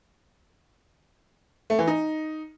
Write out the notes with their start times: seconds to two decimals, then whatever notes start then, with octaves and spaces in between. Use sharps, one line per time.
1.70 A3
1.79 E3
1.87 D#4